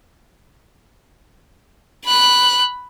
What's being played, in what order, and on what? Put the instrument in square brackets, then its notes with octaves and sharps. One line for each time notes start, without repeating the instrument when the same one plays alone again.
[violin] B5 F#6